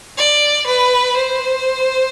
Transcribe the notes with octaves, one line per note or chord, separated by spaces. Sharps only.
D5
B4
C5